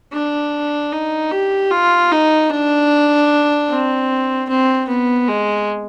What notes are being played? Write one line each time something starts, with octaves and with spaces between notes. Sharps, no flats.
D4
D#4
G4
F4
D#4
D4
C4
C4
B3
G#3